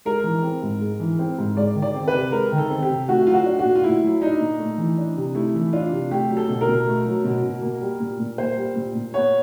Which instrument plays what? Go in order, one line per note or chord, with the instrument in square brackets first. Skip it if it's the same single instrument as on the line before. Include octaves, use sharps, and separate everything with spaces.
[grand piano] G#3 A#4
E3
C4
G#2
G#3
E3
C4
G#2
G#3 D5
D#3
D5
C4
B4
C3
G#3 A#4
D#3
A4
C4
G4
C3
A3 F#4
F#3 F4
F#4
D4
F#4
A#2
F4
A3 E4
F#3
D4 D#4
A#2
A3
E3
D4
C3
A3 E4
E3
D4 F4
C3
A3 G4
F#3
A4
B2
A#4
B2
A3
F#3
B2
B2
A#3
G3
A#2
A#2
A#3 C5
G3
A#2
A#2
B3 C#5